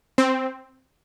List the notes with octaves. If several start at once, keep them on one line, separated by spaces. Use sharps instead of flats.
C4